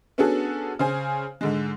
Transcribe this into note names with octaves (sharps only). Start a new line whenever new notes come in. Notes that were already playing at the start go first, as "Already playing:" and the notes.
B3 C#4 D4 F#4 G#4 A4
C#3 C5 G#5
G#2 D3 G#3